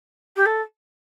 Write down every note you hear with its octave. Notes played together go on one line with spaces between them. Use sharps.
G4
A4